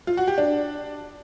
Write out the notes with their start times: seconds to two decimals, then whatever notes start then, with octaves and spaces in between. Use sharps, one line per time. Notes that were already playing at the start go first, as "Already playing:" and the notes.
0.07 F4
0.17 F#4
0.28 G4
0.38 D4